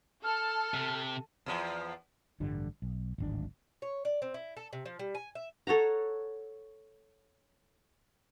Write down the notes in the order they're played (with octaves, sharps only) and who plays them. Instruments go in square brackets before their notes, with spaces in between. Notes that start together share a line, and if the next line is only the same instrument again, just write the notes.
[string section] A4 [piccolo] F6
[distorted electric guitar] C3
[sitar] E2 F3
[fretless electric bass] A1 G2 D3 G3
B1
D1 G#1 D4
[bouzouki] C#5
D5
C4
E4
A4
C3
F3
G3
G#5
E5
[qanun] A4 C#5 F#5 A#5